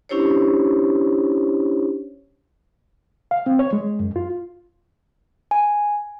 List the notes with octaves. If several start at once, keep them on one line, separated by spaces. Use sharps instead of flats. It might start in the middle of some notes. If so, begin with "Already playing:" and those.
C#4 D4 E4 G4 C5 C#5
F5
C4
C#5
G#3
F#2
F4
G#5